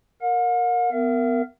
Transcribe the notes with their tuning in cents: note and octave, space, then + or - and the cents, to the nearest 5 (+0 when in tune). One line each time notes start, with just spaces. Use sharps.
A#4 +0 F#5 -45
B3 +25 A#4 -10 E5 +45